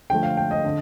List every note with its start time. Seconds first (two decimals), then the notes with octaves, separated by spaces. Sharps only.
0.10 D3 F3 A3 G5
0.23 F5
0.37 G5
0.51 D#5
0.64 D3